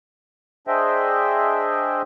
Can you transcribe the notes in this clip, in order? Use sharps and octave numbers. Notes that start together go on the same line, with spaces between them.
D4 G#4 C5 D#5 E5 G5